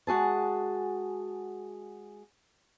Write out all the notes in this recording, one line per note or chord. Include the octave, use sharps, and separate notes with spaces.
G#3 F#4 G#4 A5